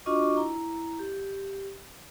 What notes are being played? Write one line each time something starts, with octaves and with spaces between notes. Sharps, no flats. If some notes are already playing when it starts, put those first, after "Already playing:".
D4 F4 F#4 D#5 C#6 D6
E4 A#5
G4